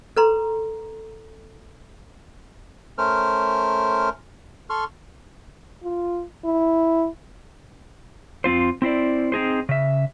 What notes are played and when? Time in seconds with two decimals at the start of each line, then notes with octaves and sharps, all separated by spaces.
0.17 A4 B4 A#5 C6
2.98 A3 C#4 A#4 C5 F6
4.70 A4 C6 C#6 F6
5.83 F4
6.45 E4
8.44 F2 C4 F4 C5
8.82 C4 E4 C5 D5
9.32 C4 D#4 G#4 C5
9.69 C#3 E5